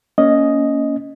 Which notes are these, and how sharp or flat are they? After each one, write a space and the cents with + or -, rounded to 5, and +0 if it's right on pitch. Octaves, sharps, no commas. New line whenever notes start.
A#3 +0 C#4 +20 D#5 +0